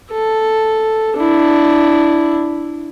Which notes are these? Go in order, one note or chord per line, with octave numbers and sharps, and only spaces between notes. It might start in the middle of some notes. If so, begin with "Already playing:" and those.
A4
D4 E4